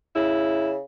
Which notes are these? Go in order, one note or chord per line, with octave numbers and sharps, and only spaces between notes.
C#3 E4